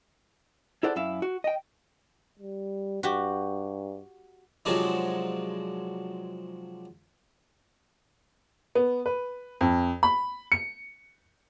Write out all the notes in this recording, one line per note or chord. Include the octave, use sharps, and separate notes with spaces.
E4 G#4 A4 C5 D5 F#5
F#2 E4 E5 F5
F#4
D#5 G5
G3
G2 F#4 G4
C3 F3 F#3 G#3 D4 D#4
B3
B4
F2
B5
C#7